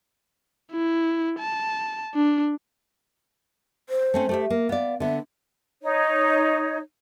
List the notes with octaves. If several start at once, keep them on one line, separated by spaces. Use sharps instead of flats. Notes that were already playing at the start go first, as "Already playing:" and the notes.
E4
A5
D4
C5
A3 C4 C#4
A3 G4 E5
A#3
B3 D5 F5
D3 B3 E5
D#4 C#5